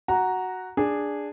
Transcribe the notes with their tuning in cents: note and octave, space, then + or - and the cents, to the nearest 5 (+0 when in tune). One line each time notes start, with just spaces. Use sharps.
F#4 +0 A#5 +0
D4 +0 G#4 -10